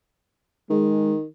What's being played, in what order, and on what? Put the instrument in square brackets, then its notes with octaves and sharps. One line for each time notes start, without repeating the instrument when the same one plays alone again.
[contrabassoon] D#3 [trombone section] G#3